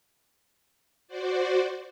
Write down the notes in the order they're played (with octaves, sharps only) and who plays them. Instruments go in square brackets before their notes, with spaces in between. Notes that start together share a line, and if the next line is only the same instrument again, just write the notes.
[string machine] F#4 C5 D5